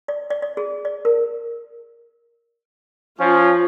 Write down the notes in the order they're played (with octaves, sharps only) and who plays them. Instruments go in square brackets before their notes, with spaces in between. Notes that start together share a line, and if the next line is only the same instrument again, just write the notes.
[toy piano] D5
D5
D5
G#4
D5
A#4
[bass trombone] F3 [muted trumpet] C#4 [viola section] F4